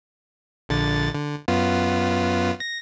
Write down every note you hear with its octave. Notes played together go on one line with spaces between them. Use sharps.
A#1 D3 A6
D3
F#2 B3 F4
A#6